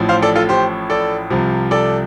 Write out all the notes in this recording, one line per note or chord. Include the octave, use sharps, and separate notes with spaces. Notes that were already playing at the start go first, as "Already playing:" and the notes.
Already playing: A1 A2 F3
C5 F5
A4 D5
F4 A4
G4 C5
A4 D5
C2 C3 F3
A4 D5